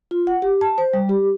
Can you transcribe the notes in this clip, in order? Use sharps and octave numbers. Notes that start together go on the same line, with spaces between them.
F4
F#5
G4
A5
C5
G3
G4